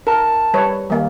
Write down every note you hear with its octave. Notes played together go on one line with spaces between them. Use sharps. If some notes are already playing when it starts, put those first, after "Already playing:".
A#4 A5
G3 B4 C#5
D#3 G3 A#3